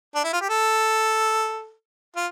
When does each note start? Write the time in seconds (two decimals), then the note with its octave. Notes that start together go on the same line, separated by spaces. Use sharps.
0.15 D4
0.24 E4
0.33 F4
0.41 G4
0.49 A4
2.16 F4